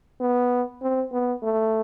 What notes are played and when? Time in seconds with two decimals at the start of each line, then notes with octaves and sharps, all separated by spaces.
0.20 B3
0.82 C4
1.12 B3
1.43 A3